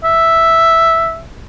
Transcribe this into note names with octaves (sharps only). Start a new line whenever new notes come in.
E5